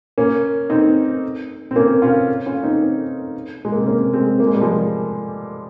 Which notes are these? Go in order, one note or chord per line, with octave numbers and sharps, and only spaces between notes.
A#3 C#4
C4 D#4
C4
A#3 C#4
C#4 F4
C#4 F4
C4 D#4
G#3
A#3
C4
A#3 C#4
G#3 C4
A#3
G#3
G3
F3 G#3